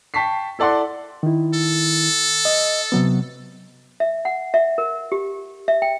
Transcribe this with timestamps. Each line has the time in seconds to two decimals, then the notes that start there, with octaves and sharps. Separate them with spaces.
0.14 G5 A5 C#6 B6 C7
0.59 E4 A4 D5 F#5 C6
1.23 D#3 E4
1.54 A4
2.45 D#5
2.92 C3 F#3 B3
4.00 E5
4.25 F#5
4.54 E5
4.78 A#4
5.12 G4
5.68 E5
5.82 G5